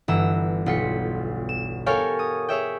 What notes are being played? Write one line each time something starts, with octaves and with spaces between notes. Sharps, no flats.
G1 E3 A#5 E6
B1 F4 B6 C#7
E7
G4 A4 A#4 C#5 F5 G#5
D#6
G#4 C#5 E5 G5